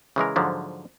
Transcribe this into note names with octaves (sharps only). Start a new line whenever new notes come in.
C#3 E3 G#3 A#4
G#2 D3 F3 F#3